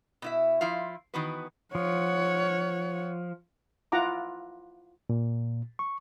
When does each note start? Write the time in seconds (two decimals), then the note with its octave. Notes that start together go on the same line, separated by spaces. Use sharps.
0.22 B2 E4 E5
0.61 F3 E4 F4 F5
1.14 D#3 E3 B3 F#4 B4
1.75 F3 C#5 F#5
3.92 E4 F4 F#5 A#5 D6
5.09 A#2
5.79 C#6